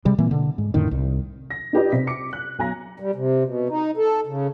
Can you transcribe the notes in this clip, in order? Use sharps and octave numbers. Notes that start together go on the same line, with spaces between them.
C3 G3 G#3
A#2 E3 A#3 C4
B2 D3
G#2
F2 A2 D3 D#3
C2
A#6
D#4 F4 G4 B4 D5 D#5
C3 B6
D6 C#7
F#6
B1 G#5 A#5 A#6
G3
C3
B2
D#4
A4
C#3